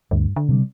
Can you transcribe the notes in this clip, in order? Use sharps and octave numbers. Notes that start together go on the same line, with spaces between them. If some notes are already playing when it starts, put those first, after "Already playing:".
D2 G2
D3
C3 G3